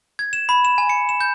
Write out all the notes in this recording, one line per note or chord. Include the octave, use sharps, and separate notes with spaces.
G#6
E7
B5
E7
G#5
C#7
E7
G6